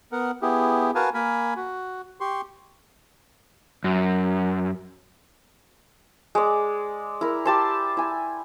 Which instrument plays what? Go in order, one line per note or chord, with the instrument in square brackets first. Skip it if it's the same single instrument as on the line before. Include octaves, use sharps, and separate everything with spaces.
[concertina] B3 A#4 F#5
B3 E4 G4 G#4
F#4 A#4 B4 F5 G#5 A5
A#3 A#4 G#5 B5
F#4
G4 C6 C#6
[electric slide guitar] F#2
[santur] G#3 D5
E4 A#4
G4 A5 C6
E4 G#5